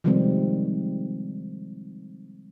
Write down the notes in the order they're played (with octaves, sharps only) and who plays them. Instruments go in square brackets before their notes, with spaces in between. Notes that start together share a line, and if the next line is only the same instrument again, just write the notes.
[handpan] C3 D#3 F3 G3 G#3 C4